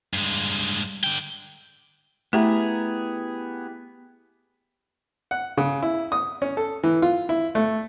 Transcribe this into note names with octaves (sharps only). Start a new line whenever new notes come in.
G2 G#3
D3 G5
A3 B3 E4 G4 G#4 A#5
F#5
C#3
E4
D#6
C#4
A4
E3
F4
E4
A3